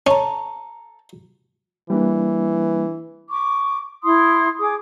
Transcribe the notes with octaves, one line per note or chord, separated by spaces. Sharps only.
C#4 A4 A#5
E3 G3 A#3 D4
C#6 D6
E4 C6 D#6
G#4 D6 D#6